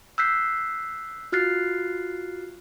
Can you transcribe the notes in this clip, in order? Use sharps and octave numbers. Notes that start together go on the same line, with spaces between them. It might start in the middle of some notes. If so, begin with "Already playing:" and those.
E6 F#6 G6 B6 C7
F4 F#4 F6 F#6 A6 C7